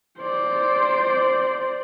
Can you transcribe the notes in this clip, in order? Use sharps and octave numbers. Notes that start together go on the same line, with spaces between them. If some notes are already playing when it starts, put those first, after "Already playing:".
C5 D5